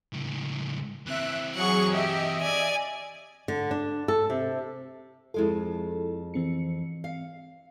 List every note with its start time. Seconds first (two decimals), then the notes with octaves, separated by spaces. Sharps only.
0.13 C#2 A2
1.06 E3 C4 E5 F#6
1.55 F#3 G#4 F#5 C#6
1.91 G4 D#5 E5
2.42 D5 G#5
3.48 D3
3.71 D4
4.08 A4
4.30 C3
5.34 F2 G#3 E4 F4 A4
6.34 E3 C4 C#7
7.04 F5